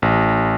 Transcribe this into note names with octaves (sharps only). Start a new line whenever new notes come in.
A1